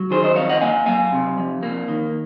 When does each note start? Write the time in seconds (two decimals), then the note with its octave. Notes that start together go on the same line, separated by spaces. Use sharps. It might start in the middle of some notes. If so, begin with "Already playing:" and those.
Already playing: F#3
0.11 D#3 G#4 C5
0.23 C5 D#5
0.36 F2 C#5 F5
0.49 D#5 F#5
0.61 A#3 F5 G#5
0.86 F#3 F5 G#5
1.12 C3
1.38 F2
1.63 A#3
1.88 D#3